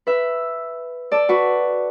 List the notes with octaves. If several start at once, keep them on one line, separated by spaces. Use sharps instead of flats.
B4 E5
A4 D5
F#4 B4